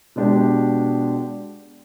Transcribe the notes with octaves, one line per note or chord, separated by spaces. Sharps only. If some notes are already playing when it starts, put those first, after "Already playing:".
B2 G#3 D4 G4